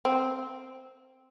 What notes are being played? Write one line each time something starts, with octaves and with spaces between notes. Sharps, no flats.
C4